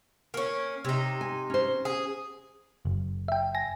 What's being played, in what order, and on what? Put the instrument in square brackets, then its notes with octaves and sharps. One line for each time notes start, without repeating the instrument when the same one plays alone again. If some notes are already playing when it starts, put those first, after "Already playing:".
[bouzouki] A#3 C#4
[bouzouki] C3 D#4 [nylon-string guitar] C#5
[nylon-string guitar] G#5
C#4 C5
[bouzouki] G#4
[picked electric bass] F#1
[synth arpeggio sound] E5 G5
G#5 A#6